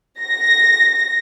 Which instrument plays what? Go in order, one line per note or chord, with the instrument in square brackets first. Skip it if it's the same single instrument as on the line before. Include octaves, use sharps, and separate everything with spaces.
[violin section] A#6